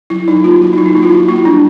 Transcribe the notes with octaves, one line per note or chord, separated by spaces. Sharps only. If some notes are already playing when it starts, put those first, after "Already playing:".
F#3 E4
F#3 D#4
A#3 F4
F#3 F#4
D#4
F#3 E4
D#4
A#3 E4
F4
F#3 F#4
A#3 E4
G3 D4